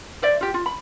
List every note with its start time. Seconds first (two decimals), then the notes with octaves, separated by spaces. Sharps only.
0.22 C5 D5 E5
0.41 F4 G4
0.54 F4
0.66 B5